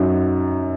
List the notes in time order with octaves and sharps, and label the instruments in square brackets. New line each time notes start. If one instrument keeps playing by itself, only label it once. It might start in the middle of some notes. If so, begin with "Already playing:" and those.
Already playing: [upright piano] F#2 D#4 [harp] F#4